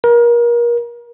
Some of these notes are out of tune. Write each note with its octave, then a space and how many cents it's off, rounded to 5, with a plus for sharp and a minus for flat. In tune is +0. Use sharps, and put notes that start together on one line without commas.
A#4 +30